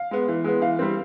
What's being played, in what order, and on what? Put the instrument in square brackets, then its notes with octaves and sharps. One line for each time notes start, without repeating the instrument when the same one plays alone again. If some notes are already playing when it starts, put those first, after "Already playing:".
Already playing: [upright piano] F5
G#3 B3
E3
G#3 B3
E3 F5
G3 C4